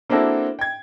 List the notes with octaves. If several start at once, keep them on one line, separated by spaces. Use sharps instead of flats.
A#3 C4 D4 E4 F#4 A4
G5 G#6